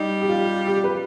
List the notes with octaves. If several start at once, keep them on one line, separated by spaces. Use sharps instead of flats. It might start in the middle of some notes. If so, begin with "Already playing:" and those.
Already playing: G3 D#4
G4
F4
G4
B4